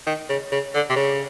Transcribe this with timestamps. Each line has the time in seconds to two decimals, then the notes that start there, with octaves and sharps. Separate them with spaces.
0.07 D#3
0.29 C#3
0.52 C#3
0.74 D3
0.89 C3
0.96 C#3